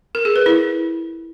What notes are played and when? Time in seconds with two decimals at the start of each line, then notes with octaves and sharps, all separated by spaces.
0.15 A#4
0.25 G#4
0.36 B4
0.46 E4